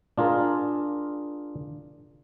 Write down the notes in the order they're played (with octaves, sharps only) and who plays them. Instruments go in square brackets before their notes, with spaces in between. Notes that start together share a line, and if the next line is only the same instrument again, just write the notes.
[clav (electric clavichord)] D4 F4 G#4 A#4